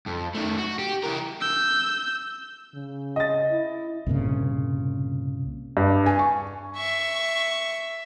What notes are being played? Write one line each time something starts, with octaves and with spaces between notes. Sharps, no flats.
F2
D#3 A3
F#4
G4
E3 A#4
E6 G6
C#3
D#5 A6
E4
C2 G2 A#2 C#3
G2
G#5
C#6
E5 C#6